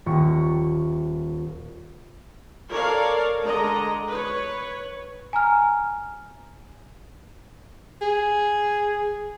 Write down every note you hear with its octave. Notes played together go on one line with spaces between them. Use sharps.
D#1 A#5 C#6
A4 A#4 C#5 D5 F5
D3 G#3 D#5 A#5
B4 C#5
G#5 A#5 F6
G#4